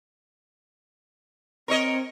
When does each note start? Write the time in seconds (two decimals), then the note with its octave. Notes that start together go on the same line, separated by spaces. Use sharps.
1.68 C4 A#4 C#5 D#5